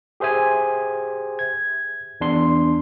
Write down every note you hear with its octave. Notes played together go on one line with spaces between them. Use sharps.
G4 G#4 C5 E5 G#5
G#6
E2 D4 C6